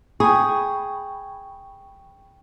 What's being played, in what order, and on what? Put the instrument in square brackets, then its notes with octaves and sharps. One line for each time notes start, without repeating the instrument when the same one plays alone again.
[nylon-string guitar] G#4 [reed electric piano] G5 B5 C#6